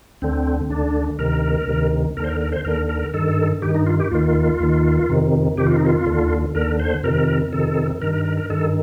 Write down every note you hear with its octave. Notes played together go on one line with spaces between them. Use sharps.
D2 D3 C4
D2 D3 D4
D2 C3 D#3 A#4
D2 C3 D#3
D#2 D3 A#4 C5
A#4
A#4
C5
D#2 D3 A#4
A#4
G2 D#3 A4
G2 D#3 G4
D#4
F4
G4
D#2 D#3 F4
D#2 D#3
F2 C3 D#3
F2 C3 D#3 G4
F4
D#4
F4
D#2 D3
D#2 D3 A#4
C5
F2 C3 D#3 A#4
F2 C3 D#3 A4
G2 D#3 A#4
A#4
A#4
A#4
G2 D#3 A4